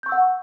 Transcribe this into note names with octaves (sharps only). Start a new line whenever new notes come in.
F#5 C#6 E6 G6